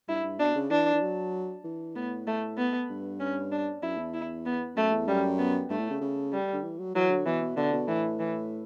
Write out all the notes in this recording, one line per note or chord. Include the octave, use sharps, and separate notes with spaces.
G2 E4
G2
B2 D4
C#3
E3 D4
E3
F#3
E3
A2 B3
A3
B3
G2
C#4
D4
F#2 E4
E2
E4
B3
F#2 A3
E2
F#2 G3
B3
G2 A3
A2
C#3
C#3
G3
D3
E3
F#3
E3 F#3
D3
B2 E3
B2
B2 D3
B2
A2 E3
E3